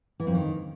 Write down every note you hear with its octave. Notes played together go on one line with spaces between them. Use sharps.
E3
F2
D#3